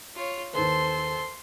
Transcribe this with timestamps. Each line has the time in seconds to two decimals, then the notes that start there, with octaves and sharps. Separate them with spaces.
0.16 F4 C#5
0.54 D#2 A4 B4 C5 C6